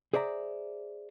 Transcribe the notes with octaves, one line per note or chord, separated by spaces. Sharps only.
G#4 C5 D5 E5 A#5